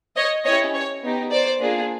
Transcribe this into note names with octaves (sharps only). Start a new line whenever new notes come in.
C#5 D#5
C#4 E4 G4 C#5 D#5
C#5
B3 D#4 G4
C5 D5
A#3 D4 F4 G#4